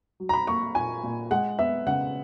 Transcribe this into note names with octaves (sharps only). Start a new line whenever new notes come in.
F#3
A#5
B5
A#3 C#6
A#2 G#5
A#2
G#3 F#5
B3 E5
C#3 F#5